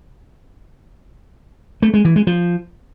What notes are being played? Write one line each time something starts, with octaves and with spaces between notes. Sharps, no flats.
A3
G#3
E3
G#3
F3